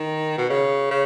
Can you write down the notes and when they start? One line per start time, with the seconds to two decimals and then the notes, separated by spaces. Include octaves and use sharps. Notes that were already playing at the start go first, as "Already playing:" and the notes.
Already playing: D#3
0.38 B2
0.50 C#3
0.91 C#3